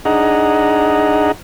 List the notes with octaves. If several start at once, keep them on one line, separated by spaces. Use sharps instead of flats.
D4 D#4 G#4 D#5 F#5 A#5